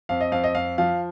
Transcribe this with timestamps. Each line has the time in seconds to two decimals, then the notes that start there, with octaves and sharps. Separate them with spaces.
0.09 F2 F5
0.21 D#5
0.32 F2 F5
0.44 D#5
0.55 F2 F5
0.78 F3 F5